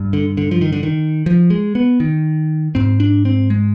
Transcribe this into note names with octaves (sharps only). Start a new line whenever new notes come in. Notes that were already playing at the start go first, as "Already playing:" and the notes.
Already playing: G2
D3
D3
F3
D#3
D3
D#3
F3
G#3
B3
D#3
G#2 C4
D4
C4
G#3